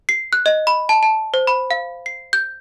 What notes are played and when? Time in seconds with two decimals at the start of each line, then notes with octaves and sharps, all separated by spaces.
0.09 C7
0.33 F#6
0.46 D#5
0.67 B5
0.89 A5
1.03 A5
1.34 C5
1.47 B5
1.71 F5
2.06 C7
2.33 G6